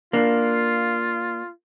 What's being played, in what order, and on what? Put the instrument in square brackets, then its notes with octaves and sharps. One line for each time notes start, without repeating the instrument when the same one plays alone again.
[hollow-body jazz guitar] A#3 D4 [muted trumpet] F4